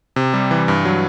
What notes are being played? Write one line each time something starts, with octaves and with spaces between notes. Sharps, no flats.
C3
G3
E3
G2
F#3